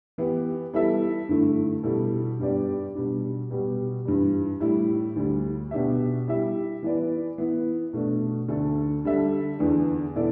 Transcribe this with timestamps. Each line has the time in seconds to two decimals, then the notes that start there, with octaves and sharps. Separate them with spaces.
0.18 E3 B3 E4 G4
0.73 G3 B3 E4 A4 E5
1.29 G2 D3 A3 E4
1.83 B2 G3 E4 A4
2.39 G2 G3 B3 G4 D5
2.94 B2 G3 D4
3.50 B2 G3 B3 G4
4.05 G2 E3 G3
4.60 A2 G3 E4
5.16 D2 D3 G3
5.71 B2 B3 D4 G4 E5
6.28 G3 E4 G4 E5
6.83 E3 B3 E4 B4 D5
7.38 E3 B3 E4
7.93 B2 A3 D4
8.48 D2 D3 A3 D4 A4
9.05 D3 G3 D4 A4 E5
9.59 E2 D3 B3 D4
10.15 B2 B3 E4 A4 D5